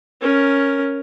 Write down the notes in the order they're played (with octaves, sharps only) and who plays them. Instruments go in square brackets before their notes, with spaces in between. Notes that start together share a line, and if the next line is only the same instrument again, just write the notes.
[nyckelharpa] C#4 A#4